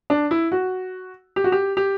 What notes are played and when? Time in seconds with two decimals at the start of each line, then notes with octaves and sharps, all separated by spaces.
0.10 D4
0.31 E4
0.52 F#4
1.36 G4
1.44 F#4
1.52 G4
1.77 G4